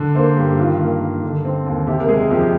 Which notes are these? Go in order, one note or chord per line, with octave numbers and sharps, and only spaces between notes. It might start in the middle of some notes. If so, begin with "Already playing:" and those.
Already playing: D3
A#3 C5
G2 G4
D#3 F4
A#3
G2
D3
C4
D#2
C3 G4
A#4
G#3 G#4
F2 G4